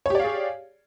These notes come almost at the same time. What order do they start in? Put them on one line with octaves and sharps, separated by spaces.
C#5 G4 D5 F5 G#4